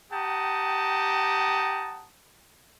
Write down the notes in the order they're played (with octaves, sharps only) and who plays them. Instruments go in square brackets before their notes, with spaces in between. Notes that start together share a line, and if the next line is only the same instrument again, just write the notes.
[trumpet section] G4 F#5 G5 A5 A#5 D#6